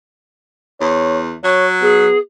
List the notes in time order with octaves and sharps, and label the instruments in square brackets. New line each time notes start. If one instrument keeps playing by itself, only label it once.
[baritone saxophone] E2 [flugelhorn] C#5
[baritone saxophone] F#3 [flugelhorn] C#5
[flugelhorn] B3 [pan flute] G#4